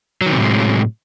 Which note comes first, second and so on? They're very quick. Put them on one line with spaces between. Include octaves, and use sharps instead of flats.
F#3 D#3 C3 A2 G#3